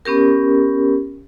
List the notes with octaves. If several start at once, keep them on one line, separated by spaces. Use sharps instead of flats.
B3 C#4 G4 A#4